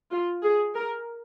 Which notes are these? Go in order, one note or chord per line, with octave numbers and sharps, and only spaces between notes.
F4
G#4
A#4